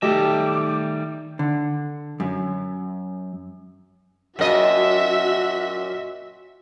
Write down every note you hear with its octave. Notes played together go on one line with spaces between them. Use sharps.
D#3 G3 A3 G4 D#5 E5 A5 D6
D3
F#2
F#2 A#2 F#4 D#5 E5